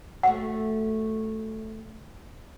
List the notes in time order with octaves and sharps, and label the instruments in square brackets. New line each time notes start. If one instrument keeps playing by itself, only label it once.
[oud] A3 C#4 F#4 [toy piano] F#5